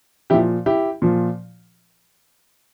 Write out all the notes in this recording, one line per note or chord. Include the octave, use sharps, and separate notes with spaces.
A#2 F3 E4 G4
E4 G4
A#2 F3